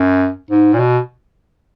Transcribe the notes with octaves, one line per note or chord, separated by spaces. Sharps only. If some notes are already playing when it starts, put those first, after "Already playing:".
Already playing: F#2
G#2
A#2
B2